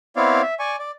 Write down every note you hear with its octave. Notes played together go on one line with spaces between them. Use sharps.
B3 C4 E4 C#5 D5 F5
E5
D5 G#5 C#6
D5